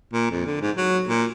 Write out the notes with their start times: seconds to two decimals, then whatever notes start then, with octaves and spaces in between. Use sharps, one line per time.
0.13 A#2
0.31 F2
0.46 D3
0.61 G#2
0.77 F#3
1.08 A#2